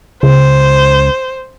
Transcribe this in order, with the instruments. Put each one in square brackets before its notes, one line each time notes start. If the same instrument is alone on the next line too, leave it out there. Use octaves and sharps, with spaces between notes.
[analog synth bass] C#2 [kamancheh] C5